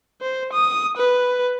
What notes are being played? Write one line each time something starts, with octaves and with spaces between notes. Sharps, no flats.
C5
D#6
B4